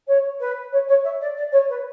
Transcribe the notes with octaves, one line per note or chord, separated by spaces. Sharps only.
C#5
B4
C#5
C#5
E5
D5
D5
C#5
B4